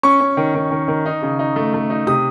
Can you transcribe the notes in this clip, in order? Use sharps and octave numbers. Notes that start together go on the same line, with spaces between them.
C#4 C#6
C#4
D#3
D#3
D#3
D#3
D#4
C#3
D#4
A3
A3
D#4
C3 D#6